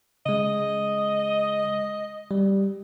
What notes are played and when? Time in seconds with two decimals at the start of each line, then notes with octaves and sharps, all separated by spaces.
0.26 C#3 G#3 D#5
2.31 G3